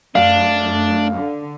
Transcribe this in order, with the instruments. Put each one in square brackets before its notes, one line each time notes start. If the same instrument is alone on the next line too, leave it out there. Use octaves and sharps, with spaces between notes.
[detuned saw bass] F#2 [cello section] A3 [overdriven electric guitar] D4 [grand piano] F5
[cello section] D3